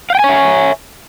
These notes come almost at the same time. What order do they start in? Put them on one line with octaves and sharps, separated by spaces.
F5 G5 G#5 C#5 E5